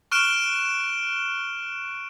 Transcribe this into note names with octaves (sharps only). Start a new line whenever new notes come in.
C#6 F6 F#6 D7 E7 G7